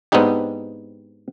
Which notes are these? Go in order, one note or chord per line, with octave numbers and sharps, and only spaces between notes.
G#2 B3 C4 D4 D#4 G4